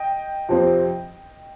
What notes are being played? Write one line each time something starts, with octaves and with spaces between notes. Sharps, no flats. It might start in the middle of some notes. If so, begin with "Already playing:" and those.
Already playing: D#5 G5
F2 C3 F3 C4